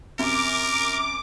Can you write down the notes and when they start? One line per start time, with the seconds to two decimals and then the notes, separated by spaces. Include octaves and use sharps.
0.19 F#2 C3 A#4 D6